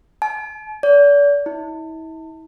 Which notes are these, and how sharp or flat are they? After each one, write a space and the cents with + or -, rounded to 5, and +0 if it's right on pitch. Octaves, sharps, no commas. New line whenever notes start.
A5 -45
D5 -40
E4 -40